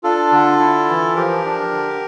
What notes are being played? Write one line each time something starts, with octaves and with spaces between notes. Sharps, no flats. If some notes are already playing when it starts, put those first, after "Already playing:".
D4 F4 A4
D3
E4
E3
F3 G4 A#4
D4
D3